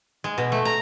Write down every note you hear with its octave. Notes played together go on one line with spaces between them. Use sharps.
G#3
B2
A3
A#5